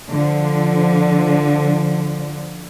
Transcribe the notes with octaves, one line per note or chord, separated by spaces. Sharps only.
D3 F3